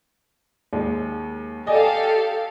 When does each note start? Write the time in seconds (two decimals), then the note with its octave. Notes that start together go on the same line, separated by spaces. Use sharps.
0.73 D#2 G#3
1.67 G4 A4 D5 D#5 F5 G#5